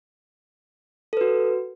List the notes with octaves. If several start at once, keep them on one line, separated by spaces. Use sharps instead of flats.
F#4 A4 B4